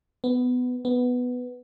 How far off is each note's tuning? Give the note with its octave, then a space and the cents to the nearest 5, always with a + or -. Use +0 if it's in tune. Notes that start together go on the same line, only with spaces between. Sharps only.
B3 +15
B3 +5